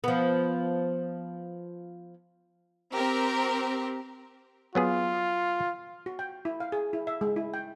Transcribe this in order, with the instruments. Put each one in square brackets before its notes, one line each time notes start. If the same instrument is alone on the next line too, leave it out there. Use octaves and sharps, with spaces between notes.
[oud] F3 B3
[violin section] C4 G4 A#4
[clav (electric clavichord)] F#3 B3 G#4 [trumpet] F4
[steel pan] F#4
G5
E4
F5
G#4
E4
E5
G#3
E4
G5